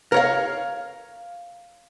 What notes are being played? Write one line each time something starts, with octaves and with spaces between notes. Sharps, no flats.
A#4 C#5 F5